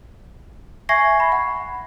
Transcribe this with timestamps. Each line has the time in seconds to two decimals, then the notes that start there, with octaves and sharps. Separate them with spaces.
0.89 E5 G#5 C#6 G#6 A#6 C7
1.20 B5
1.32 F#5